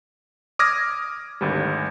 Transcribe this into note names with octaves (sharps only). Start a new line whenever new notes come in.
D6 D#6 F6 G#6 A#6
G#1 D2 G3